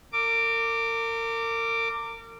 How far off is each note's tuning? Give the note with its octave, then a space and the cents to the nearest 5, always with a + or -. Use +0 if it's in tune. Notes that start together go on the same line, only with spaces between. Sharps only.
A#4 -35 D6 +0